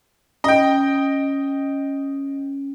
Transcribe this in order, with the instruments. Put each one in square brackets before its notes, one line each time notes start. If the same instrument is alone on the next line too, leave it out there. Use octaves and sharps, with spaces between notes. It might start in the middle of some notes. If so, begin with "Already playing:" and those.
[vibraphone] C#4 [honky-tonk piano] D#5 G5